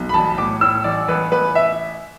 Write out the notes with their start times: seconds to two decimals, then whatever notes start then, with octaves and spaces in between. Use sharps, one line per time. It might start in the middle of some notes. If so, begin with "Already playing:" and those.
Already playing: B1
0.09 B5
0.14 A1 A5
0.37 A2 D6
0.61 A2 E6
0.84 A1 D5
1.08 A1 B4
1.32 A1 B4
1.55 E5